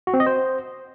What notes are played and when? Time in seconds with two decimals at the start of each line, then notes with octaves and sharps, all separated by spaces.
0.07 F#4
0.14 C4
0.20 D#5
0.27 C5